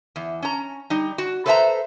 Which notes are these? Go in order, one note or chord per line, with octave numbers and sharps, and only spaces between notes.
E2
C#4 A#5
G3 D#4
F#4
A4 B4 C5 D5 E5 A#5